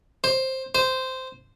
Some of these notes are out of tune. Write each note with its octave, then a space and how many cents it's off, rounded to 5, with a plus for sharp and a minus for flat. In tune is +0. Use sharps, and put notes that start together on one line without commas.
C5 +10
C5 -10